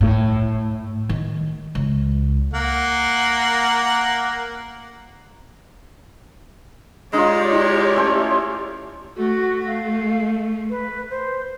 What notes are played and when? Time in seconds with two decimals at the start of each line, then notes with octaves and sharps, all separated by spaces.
0.01 A2
1.09 D#3
1.75 C#2
2.54 A#3 F#5
7.13 G#3 D4 D#4 F4 G4 C#5 D5
7.53 E4
7.96 A3 C#4 C5
9.16 A3 F#4
9.67 F5
10.70 B4
11.10 C5